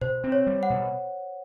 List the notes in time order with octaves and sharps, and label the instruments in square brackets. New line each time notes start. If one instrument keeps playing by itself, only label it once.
[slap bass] B2 [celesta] C5
[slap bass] C4
[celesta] C#5
[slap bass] G3
[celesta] F#5
[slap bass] B2